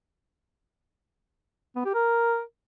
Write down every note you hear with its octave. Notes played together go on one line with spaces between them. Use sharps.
B3
G4
A#4